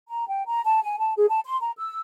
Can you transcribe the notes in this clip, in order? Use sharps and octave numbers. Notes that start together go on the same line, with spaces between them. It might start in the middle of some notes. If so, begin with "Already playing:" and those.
A#5
G5
A#5
A5
G#5
A5
G#4
A5
C6
A#5
E6